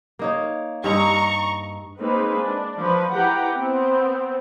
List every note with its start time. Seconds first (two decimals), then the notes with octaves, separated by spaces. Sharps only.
0.19 A#3 D#4 C#5
0.84 G2 D#4 A#5 C#6
2.00 G#3 A#3 C4 D#4 B4
2.37 D4
2.78 F3 B4
3.14 E4 G4 B4 F#5 G5 A#5
3.54 B3 C4